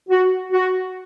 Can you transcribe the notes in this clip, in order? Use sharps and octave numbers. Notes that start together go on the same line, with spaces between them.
F#4
F#4